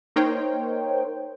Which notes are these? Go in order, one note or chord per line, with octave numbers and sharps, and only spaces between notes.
A#3 D#4 A#4 C5 C#5 G5